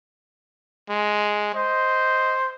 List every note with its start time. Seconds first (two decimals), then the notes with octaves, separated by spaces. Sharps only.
0.90 G#3
1.55 C5 D#5